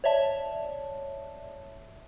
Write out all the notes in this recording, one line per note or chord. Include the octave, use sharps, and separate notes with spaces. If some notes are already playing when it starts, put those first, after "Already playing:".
C#5 D5 E5 A5